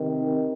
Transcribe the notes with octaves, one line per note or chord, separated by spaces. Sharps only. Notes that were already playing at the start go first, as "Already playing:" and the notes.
Already playing: C3 D#3